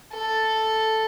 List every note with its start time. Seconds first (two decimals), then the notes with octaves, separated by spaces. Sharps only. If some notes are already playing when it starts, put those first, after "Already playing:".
0.14 A4